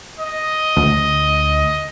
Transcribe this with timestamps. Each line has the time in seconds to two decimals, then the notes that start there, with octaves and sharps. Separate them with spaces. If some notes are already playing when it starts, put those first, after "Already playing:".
0.20 D#5
0.76 D2